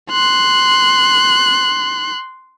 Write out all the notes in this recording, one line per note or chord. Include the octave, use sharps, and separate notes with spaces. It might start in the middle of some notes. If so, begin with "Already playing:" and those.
C6 F#6